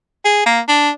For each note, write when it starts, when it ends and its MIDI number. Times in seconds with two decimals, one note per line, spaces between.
0.25 0.41 68
0.46 0.61 58
0.68 0.90 62